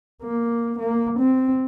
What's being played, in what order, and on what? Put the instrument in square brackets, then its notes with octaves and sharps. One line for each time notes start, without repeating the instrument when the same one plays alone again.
[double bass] A#3
A#3
C4